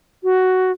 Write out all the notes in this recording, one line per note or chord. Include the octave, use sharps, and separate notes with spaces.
F#4